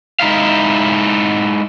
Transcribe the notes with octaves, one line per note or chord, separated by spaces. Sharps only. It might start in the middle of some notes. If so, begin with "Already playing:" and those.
G#3 D#4 E4 F5